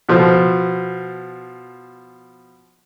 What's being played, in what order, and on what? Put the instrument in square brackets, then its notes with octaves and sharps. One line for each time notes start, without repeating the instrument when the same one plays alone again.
[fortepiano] B2 F3